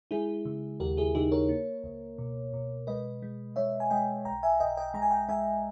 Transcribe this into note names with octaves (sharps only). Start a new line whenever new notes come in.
G#3 E4 G#4
C#3
D#2 G4 A#4
E4 G#4
C#3 D#4 G4
A#4 C#5
A#3
C#2
B2
B2
G#3 B4 D#5
G#3
G#3 C#5 E5
G#5
G#3 D#5 G5
B1 G5 A#5
E5 G#5
B1 D#5 G5
D#5 G5
G#3 A#5
G#5
G5 A#5
G#3 E5 G#5